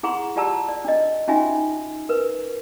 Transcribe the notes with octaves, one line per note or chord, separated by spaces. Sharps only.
E4 G#4 F#5 A#5 C6 C#6
F4 G4 D5 A5 A#5 E6
D5
D4 D#5
C#4 D#4 F4 F#4 E5 G#5
A#4 B4